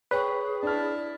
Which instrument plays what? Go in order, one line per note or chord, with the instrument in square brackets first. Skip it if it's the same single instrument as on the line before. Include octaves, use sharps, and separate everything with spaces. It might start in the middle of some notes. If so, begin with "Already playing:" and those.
[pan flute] G#4 [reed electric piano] B4 [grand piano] C#5 G5 C#6
[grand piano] D4 F6 [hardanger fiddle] E4 A5